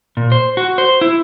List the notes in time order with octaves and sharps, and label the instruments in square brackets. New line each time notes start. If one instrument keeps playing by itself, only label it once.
[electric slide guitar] A#2
C5
F#4
C5
E4